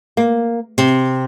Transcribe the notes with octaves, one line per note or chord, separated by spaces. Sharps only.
A#3
C3